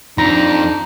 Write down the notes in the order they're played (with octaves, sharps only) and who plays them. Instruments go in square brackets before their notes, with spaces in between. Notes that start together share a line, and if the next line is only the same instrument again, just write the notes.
[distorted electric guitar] F2 [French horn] D4 [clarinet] D#4 [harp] A#5